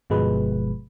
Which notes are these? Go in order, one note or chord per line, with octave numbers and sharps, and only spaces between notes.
G1 B2 F3 G#3 B4